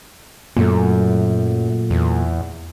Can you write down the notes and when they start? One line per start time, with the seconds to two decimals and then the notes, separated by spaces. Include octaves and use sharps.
0.57 F#2 A#2 F#3 A3
1.90 E2